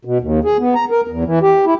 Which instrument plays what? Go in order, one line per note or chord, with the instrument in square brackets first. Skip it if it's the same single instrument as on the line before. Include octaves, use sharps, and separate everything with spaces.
[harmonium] B2
D#2
G#4
B3
A#5
A#4
E2
E3
G4
E4